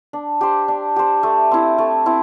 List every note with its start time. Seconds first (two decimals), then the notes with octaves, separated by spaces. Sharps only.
0.13 D4
0.41 G4 C5
0.68 D4
0.96 G4 C5
1.23 A3
1.51 C4 E4
1.78 A3
2.06 C4 E4